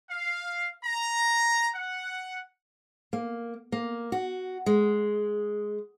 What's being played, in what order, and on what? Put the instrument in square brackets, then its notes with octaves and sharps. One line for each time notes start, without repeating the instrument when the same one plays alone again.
[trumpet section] F5
A#5
F#5
[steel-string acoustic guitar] A#3
A#3
F#4
G#3